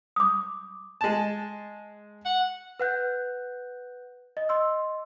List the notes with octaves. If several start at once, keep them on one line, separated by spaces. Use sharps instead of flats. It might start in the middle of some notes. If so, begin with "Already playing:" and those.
D6 D#6
G#3 A5
F#5
B4 F#5 F#6 G6
D#5
D#5 C6 E6